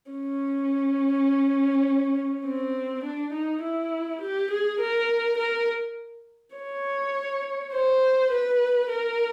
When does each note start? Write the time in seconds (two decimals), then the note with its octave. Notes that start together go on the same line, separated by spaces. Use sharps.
0.11 C#4
2.45 C4
3.04 D4
3.33 D#4
3.62 E4
4.21 G4
4.51 G#4
4.80 A#4
5.38 A#4
6.55 C#5
7.73 C5
8.31 B4
8.90 A#4